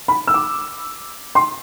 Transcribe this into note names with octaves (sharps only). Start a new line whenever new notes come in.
B5
E6
D6
C6